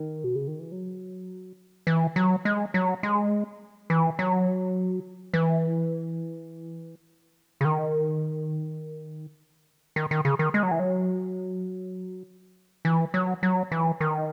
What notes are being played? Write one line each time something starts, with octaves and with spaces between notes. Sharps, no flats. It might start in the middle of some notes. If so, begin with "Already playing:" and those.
Already playing: D#3
B2
C#3
D#3
E3
F#3
E3
F#3
G#3
F#3
G#3
E3
F#3
E3
C#3
D#3
D#3
D#3
C#3
D#3
G#3
F#3
E3
F#3
E3
F#3
F#3
E3
D#3